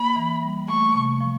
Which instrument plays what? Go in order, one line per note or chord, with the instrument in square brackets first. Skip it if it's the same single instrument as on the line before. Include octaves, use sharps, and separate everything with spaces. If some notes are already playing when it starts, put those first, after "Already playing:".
Already playing: [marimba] A#3 [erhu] B5
[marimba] E3
G3
[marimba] A3 [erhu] C#6
[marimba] C3
F3